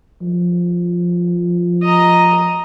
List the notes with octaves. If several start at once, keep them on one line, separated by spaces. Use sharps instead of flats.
F3
D#5 A#5